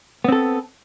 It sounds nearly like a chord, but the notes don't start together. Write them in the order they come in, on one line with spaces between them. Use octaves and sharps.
B3 C4 A4